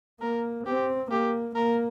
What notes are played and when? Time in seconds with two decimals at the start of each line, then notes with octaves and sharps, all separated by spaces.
0.21 A#3 A#4
0.66 C4 G4
1.11 A#3 G4
1.56 A#3 A#4